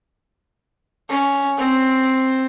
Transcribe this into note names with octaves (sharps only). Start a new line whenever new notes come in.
C#4
C4